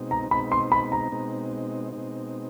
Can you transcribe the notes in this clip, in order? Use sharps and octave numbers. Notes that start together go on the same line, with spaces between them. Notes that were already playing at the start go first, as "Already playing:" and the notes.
Already playing: B2 G#3 C4 D#4
A#5
B2 G#3 C4 D#4 B5
C6
B5
A#5
B2 G#3 C4 D#4
B2 G#3 C4 D#4